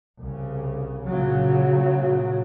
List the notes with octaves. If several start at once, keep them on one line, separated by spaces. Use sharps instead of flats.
C2 C#3
A#2 C#3 F#3